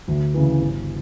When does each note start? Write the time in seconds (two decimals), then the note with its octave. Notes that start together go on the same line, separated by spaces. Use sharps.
0.08 D2
0.34 C#3 E3
0.61 G1